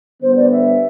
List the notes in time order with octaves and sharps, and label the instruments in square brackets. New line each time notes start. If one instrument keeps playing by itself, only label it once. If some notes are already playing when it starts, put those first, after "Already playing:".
[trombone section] D3 G3 B3 [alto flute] C5
[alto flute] D5
E5